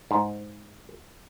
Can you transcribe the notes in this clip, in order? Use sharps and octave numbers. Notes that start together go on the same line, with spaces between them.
G#2